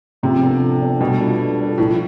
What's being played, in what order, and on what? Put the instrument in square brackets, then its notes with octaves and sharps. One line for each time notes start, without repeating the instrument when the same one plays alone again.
[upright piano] C3 [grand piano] F3
[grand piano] B3 D4 A4
F3
B3 D4 A4
[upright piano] B2 [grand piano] G3
[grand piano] D4 F4 A4
G3
D4 F4 A4
[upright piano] A2 [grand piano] F3